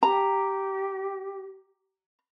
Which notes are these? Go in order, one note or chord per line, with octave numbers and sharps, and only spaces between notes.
G4 A#5